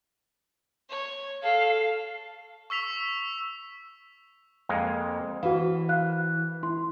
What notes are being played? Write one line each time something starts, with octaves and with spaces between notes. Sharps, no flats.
C#5
A4 F5
C#6 E6 B6 F7
F2 G#3 A#3
E3 F#4 C5 F5
F5 F#6
E4 C6